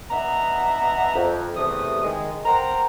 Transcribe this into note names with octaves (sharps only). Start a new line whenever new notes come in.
B3 D4 D#5 E5 F#5 A#5
F2
E2 C3 A3 D#6
D#3 G#3
A#4 C5 F#5 G5 A#5